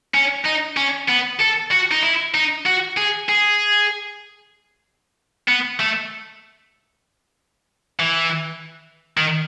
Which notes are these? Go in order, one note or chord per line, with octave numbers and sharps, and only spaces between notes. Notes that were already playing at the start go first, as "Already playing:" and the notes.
C#4
D#4
C#4
B3
A4
F#4
D#4
E4
D#4
F#4
G#4
G#4
B3
A3
E3
D#3